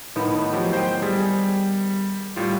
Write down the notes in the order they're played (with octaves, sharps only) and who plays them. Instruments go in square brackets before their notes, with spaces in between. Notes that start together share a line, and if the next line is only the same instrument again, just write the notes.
[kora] A2 D#3 B3
[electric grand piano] F3 F#3 G4
C5 G5
[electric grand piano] G3 [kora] G#4
[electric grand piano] A2 G3 F4